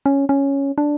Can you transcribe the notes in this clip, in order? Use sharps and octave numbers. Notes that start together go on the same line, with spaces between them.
C#4
C#4
D4